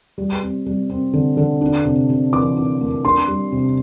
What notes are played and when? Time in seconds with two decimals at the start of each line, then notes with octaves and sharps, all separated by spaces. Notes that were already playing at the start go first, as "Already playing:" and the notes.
0.18 G3
0.42 C4
0.66 G3
0.89 C4
1.13 D3
1.37 D3
1.61 D4
1.85 C3
2.09 C3
2.33 E3 D6
2.56 D4
2.81 A#3
3.05 D4 C6
3.28 G3
3.52 C3